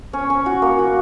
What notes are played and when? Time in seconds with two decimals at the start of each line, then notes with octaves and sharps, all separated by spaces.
0.13 C#4
0.30 C#4
0.46 F#4
0.62 A#3
0.79 F#4